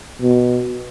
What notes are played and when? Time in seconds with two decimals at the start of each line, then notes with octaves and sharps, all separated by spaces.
0.21 B2